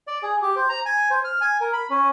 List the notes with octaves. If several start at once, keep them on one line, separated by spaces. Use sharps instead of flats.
D5
G#4
G4
C5
A#5
G#5
C5
F6
G#5
A#4
B5
C#4